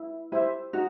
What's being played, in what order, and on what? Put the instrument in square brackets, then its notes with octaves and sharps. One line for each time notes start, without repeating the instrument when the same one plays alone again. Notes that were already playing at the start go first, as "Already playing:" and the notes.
Already playing: [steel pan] E4
[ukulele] E4 [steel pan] G4 C5 E5
[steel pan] D#4 [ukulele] F#4